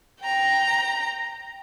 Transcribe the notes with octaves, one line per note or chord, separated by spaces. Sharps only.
G5 A#5